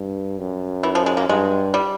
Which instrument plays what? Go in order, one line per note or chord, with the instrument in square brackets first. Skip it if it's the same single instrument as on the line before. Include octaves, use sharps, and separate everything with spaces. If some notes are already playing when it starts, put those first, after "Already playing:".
Already playing: [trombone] G2
F#2
[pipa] E3
F3
G#3
A#3
[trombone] G2 [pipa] G#3
[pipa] G3